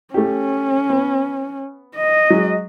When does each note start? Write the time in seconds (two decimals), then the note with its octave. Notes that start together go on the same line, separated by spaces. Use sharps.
0.14 A3 C#4 G4
0.90 B3
1.97 D#5
2.30 F#3 G#3